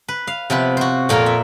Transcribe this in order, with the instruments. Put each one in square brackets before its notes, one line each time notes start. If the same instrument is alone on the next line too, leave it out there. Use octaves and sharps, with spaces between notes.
[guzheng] B4
F5
C3 F3 B3 B4
F#4 C5
F2 A#2 F4 A#4 A#5
E5